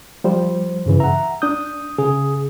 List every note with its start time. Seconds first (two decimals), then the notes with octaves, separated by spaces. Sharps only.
0.24 F3 G3 C5
0.86 G2 C#3 E3
1.00 E5 F#5 A#5
1.42 D4 D#6 G6
1.98 C#3 G#4